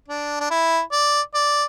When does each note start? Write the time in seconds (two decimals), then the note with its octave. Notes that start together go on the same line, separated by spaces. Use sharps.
0.08 D4
0.40 D4
0.51 E4
0.92 D5
1.35 D5